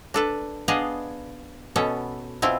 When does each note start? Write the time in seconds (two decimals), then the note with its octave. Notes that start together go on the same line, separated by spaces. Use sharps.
0.14 D4 A4 B4
0.68 B3 D4 G#4 D#5 F5
1.76 B2 B3 C#4 A4
2.42 B2 C4 E4 F4